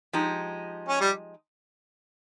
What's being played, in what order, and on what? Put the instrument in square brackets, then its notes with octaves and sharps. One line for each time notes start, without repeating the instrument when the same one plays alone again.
[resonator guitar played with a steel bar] F3 G#3 D#4 G4
[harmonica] C#4
G3